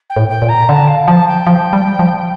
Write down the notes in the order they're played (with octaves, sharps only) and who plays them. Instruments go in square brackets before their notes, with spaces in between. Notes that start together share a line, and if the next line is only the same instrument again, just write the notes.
[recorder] G5
[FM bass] A2
[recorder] G5
[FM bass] A#2
[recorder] A#5
[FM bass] D3 [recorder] A5
[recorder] F5
[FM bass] F3 [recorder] A5
[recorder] G5
[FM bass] F3
G3
F3